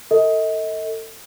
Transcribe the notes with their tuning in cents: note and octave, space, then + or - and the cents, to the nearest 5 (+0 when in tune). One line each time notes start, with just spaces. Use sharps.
A4 +30 D#5 +35